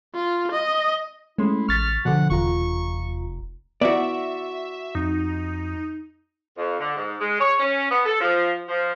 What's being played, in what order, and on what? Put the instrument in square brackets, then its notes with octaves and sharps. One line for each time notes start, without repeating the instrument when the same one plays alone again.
[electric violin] F4
D#5
[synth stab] G#3 [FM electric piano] A3 C#4 C6 [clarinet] E4
[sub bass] A1 [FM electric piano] C#6 A6 B6 [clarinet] F6
[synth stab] B2 D3 [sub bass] F3 [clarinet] F#5
[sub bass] F1 [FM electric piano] E2 F4 A#5 [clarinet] C#6
[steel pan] B3 E4 [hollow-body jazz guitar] F#4 D5 [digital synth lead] E5
[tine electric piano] F2 [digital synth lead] D#4
[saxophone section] F2
D3
G#2
G#3
C#5
C#4
B3
A4
F3
F3